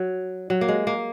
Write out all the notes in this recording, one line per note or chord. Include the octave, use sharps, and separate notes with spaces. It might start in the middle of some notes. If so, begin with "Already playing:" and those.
Already playing: F#3
F#3
A#3
G#3
A#3